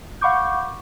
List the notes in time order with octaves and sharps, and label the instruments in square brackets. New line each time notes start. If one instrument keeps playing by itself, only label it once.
[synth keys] F5 F#5 B5 C#6 D6 G6